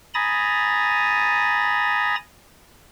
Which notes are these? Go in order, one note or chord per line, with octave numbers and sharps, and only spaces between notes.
G#5 A#5 B5 D#6 A6